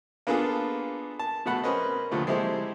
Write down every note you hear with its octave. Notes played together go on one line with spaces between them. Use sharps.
A#3 B3 D4 F4 G#4 A4
A5
B2 A3 F#5 B5
C4 C#4 A#4 B4 D#5
D#2 A#2 D3 F3 A3
G#3 C4 E4 G4 A4 C5